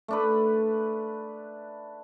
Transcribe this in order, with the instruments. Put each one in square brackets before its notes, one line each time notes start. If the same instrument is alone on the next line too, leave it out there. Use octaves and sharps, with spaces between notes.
[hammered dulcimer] A3 D4 B4